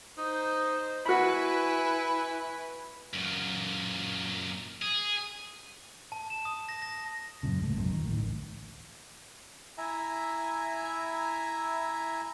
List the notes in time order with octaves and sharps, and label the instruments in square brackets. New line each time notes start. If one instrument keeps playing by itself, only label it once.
[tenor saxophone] D#4 [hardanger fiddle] C5
[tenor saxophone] E4 [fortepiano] F#4 B5 [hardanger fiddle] B4 G#5
[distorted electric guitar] F#2 A#2
G#4
[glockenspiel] A5
E7
D#6
A#6
A#6
[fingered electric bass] F#2 A#2 C#3
C#2 G#2 G3 A3
F1 B1 F#2 A#2
D#3
D2 A2 D#3
A1
[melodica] E4 E5 G#5 A#5